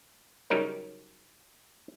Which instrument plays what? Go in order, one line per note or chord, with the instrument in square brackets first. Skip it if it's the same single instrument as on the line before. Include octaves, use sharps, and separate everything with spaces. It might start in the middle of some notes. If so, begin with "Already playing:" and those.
[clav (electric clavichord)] C#3 F#3 G3 D#4 A#4 C#5